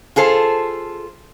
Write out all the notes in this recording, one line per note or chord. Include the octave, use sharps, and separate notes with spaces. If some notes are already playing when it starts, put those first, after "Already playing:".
F4 G#4 A4 C5